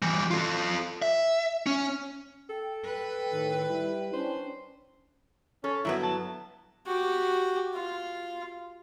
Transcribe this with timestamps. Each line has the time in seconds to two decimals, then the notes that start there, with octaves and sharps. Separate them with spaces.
0.02 E3 G3
0.31 F4 A4
1.02 E5
1.66 C#4
2.50 A4 G5
2.84 B4
3.31 A2 D#3
3.68 G3 E4
4.13 C#4 D4 C5
5.64 C#4 A4
5.85 G2 F#3 B3 E4
6.03 A5
6.86 F#4 G4
7.74 F4